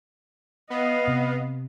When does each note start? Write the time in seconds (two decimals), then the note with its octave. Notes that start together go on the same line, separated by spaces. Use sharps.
0.70 B3 D#5 F5
1.08 C3